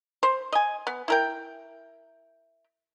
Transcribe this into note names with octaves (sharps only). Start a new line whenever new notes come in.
C5
D#5 G#5
B3
E4 A#4 G5